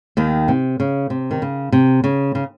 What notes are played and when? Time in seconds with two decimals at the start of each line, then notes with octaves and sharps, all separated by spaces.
0.17 D#2 D#3
0.48 C3
0.80 C#3
1.10 C3
1.31 D#3
1.42 C#3
1.72 C3
2.04 C#3
2.35 C#3